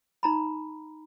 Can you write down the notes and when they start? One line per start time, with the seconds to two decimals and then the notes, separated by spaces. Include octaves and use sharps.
0.23 D#4 A#5 B5